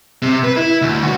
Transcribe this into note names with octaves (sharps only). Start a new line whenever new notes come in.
C3
B4
E4
D2
C#2 F#4